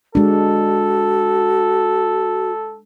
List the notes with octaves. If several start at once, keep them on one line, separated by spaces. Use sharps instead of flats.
G#3 D4 F#4 A4